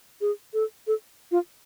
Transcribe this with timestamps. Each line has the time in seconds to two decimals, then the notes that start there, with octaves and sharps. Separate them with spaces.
0.21 G#4
0.54 A4
0.87 A4
1.31 F4